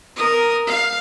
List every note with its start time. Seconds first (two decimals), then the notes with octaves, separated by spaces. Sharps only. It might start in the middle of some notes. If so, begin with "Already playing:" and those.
0.16 A#4 D#6
0.67 F5